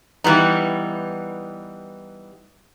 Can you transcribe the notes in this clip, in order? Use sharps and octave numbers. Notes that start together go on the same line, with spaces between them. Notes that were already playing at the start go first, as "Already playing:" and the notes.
E3 G3 B3 D#4